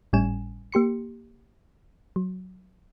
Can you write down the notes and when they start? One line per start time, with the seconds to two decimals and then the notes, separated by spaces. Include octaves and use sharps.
0.13 G#1 A2 G3 C#4 G#5 E7
0.72 A#3 G4 C6 C#7
2.16 F#3